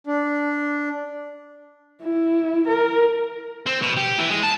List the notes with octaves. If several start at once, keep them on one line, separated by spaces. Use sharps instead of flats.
D4
E4
A#4
C4
B2
G4
E3
G#3
A5